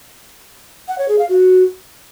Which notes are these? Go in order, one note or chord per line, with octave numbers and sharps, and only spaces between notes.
F#5
C#5
G#4
F5
F#4